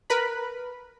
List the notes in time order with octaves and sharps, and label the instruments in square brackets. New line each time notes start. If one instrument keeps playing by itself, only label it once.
[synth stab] A#4 B4 B5